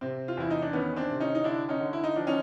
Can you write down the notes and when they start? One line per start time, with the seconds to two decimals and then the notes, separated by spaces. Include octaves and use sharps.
0.01 C3 C4
0.28 F4
0.37 E2 E4
0.50 D#4
0.62 D4
0.73 D#3 B3 C#4
0.96 C4 D4
1.10 C3
1.20 C#4 D#4
1.35 D#4
1.44 D3 D4 E4
1.69 C#4 D#4
1.80 D3
1.93 E4
2.04 D#4
2.16 F3 D4
2.27 C#4 D#4